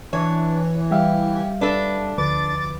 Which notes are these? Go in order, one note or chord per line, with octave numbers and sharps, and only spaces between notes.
E3 D4 C#5
G3 G4 E5 F5
D4 A4 B4
D2 F3 B4 D6 A6